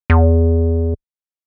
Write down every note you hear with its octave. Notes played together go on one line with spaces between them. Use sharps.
E2